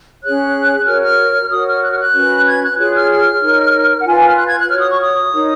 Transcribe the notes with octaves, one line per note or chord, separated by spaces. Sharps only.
C#4 G#4 C#5 F#6
F#4 A#4 C#5 F6
F6
F#4 A#4 C#5 D#6
F6
F#6
F6
F#6
C#4 F#4 B4
G#6
F#6
F4 G#4 C#5 F#6
F6
F6
D#4 A#4 C#5
F#5
F4 B4 G#5
G#5
F6
F#6
G#6
F#6
F#4 C#5 F6
D#6
C#6
D#6
D#4 A#4 C#5